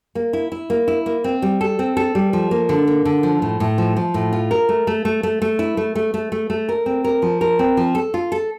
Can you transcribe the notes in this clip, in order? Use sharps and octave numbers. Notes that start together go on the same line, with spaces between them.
A#3
E4
E4
A#3
E4
A#3
C4
G3
A4
C4
A4
G3
F3
A#3
D3
A#3
D3
F3
A2
A2
F3
F3
A2
F4
A#4
A3
A3
A3
A3
A3
E4
A3
A3
A3
A3
A3
A#4
C4
A#4
F3
A#4
C4
F3
A4
F4
A4